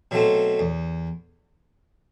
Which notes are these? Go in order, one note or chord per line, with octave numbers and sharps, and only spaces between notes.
B2 F#3 A3 C4
E2